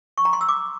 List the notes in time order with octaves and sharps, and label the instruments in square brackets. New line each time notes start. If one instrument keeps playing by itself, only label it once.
[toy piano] C#6
A#5
C6
E6
D6